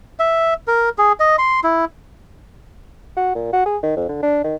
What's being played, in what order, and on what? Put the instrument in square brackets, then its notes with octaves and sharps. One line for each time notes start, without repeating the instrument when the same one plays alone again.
[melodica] E5
A#4
G#4
D#5
C6
E4
[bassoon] F#4
A#2
F#4
G#4
D#3
F2
D3
D4
D#3